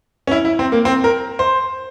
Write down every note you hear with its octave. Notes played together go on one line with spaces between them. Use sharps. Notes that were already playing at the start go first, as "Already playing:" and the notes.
C#4
E4
E4
C4
A#3
C4
A#4
C5